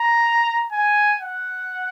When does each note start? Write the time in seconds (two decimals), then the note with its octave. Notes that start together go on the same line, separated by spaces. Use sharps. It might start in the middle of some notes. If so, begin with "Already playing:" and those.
Already playing: A#5
0.72 G#5
1.20 F#5